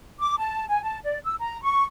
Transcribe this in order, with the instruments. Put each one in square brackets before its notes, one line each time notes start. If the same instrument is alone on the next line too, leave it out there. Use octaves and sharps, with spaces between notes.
[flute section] D6
A5
G#5
A5
D5
E6
A#5
C#6